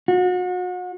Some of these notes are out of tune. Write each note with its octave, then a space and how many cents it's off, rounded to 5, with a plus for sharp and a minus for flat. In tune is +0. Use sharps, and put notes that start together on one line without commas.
F#4 -35